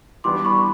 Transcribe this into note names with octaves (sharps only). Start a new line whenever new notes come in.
E3 G3 B3 D4 C6 D6
B5 C#6